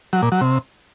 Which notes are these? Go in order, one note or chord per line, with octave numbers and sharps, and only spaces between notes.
F#3
A#2
F#3
C3